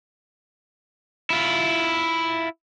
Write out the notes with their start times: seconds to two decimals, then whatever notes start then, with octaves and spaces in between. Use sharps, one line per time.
1.30 E4 F4